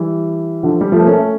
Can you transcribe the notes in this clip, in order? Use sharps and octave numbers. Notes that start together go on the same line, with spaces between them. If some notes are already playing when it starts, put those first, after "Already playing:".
Already playing: E3 G3
D3 F3
G3
F3 A3
A#3
A3 C#4
A3